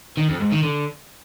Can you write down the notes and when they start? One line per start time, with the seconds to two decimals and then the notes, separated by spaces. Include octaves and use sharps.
0.17 D#3
0.29 F2
0.40 G#2
0.52 D#3
0.63 D3